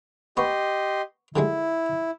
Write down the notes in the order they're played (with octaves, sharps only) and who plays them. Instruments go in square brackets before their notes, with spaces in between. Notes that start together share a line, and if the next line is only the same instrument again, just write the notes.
[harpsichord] B3 C#6 [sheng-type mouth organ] G4 D#5 C6
[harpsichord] D3 G3 G#3 [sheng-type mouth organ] E4